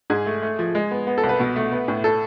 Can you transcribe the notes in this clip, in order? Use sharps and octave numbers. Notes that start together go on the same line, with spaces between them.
G#2 G#4
A3
A3
F3
G#3
B3
B3
A4
C2
B4
B2
A3
B3
A2
A4